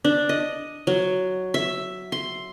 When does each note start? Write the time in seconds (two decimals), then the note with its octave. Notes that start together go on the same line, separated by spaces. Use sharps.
0.04 D4
0.29 D#5
0.87 F#3
1.54 E5
2.12 C6